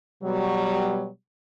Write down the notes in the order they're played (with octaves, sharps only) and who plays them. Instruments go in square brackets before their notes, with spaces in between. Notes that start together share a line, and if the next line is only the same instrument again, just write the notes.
[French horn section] B2 F#3 G3